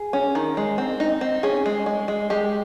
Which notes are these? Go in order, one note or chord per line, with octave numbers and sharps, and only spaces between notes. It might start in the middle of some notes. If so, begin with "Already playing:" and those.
Already playing: G#4
C#4
D#3
G#3
C4
D#4
C4
C#4 G#4
G#3
G#3
G#3
G#3 G4